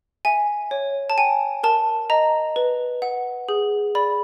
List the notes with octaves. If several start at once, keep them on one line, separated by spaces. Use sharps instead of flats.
E5 G#5
C#5
A5
G5 G#5
A#4 A5
D#5 A#5
B4
F#5
G#4
D5 B5